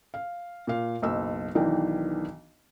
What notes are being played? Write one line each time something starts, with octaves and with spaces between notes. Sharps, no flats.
F5
A#2 F5
F#1 B1 E6
B1 D#3 E3 D4 G5